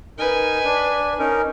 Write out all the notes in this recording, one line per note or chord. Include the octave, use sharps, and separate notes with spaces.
D#4 A#4 B4 G#5
D4
C#4 D#4 A#4